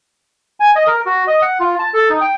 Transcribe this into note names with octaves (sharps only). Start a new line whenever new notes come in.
G#5
D#5
A#4
F#4
D#5
F#5
F4
A5
A4
D#4
G5